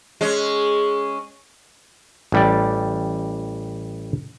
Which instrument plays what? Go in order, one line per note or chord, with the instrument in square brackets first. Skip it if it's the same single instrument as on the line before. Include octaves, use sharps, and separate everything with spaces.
[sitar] G#3 C#4
[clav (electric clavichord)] A1 G3 D5